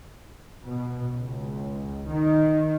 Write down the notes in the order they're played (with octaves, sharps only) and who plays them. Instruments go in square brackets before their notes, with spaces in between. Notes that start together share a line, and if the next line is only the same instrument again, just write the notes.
[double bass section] B2
C#2
D#3